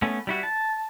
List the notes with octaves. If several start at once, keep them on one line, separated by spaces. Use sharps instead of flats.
A3 B3 C#4
G3 E4 F#4
A5